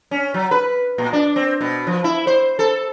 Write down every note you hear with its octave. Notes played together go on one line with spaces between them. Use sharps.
C#4
F#3
B4
A#2
D4
C4
B2
F3
E4
C5
A4